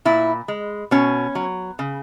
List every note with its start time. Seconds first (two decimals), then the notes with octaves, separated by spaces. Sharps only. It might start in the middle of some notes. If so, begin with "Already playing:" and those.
0.05 A#2 E4
0.48 G#3
0.91 B2 C#4
1.35 F#3
1.79 C#3